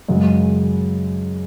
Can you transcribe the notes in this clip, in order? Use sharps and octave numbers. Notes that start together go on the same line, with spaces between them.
F#2 C#3 G#3